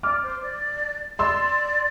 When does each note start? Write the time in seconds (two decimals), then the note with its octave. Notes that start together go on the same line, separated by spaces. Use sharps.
0.03 D5 D6 F6
0.23 C5
0.42 D5
1.19 D5 C6 E6